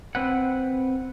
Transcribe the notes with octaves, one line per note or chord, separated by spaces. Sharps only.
C4 B4 F#5